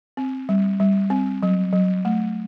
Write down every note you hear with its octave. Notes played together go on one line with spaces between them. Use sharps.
C4
G3
G3
C4
F#3
F#3
A3